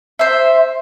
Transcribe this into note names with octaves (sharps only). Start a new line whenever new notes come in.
C5 E5